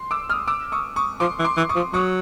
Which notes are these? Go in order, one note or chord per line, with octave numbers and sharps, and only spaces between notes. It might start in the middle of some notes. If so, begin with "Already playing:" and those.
Already playing: C6
D6 E6
D#6 F6
D6 E6
C#6 D#6
C#6 D#6
F3 C6 D6
E3
C6 D6
E3
C#6 D#6
F3
F#3 C#6 D#6